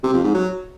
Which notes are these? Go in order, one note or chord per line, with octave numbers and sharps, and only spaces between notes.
C3
F2
G#2
F#3